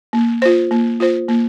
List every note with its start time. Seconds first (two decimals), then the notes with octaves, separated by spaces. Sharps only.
0.13 A#3
0.42 F4 C5
0.71 A#3
1.00 F4 C5
1.29 A#3